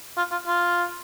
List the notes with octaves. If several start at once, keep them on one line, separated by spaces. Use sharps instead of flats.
F4
F4
F4